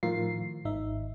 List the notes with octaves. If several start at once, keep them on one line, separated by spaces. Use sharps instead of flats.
A2 D#3 F3 F4 A#4 C7
G#1 D#4 E5